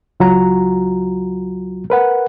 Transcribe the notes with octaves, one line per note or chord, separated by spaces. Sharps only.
C#2 F#3 F4 F#4 A#5
A#4 B4 F#5